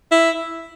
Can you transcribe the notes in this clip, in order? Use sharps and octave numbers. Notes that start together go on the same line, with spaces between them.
E4